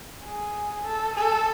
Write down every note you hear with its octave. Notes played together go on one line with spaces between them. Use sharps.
G#4
A4
A4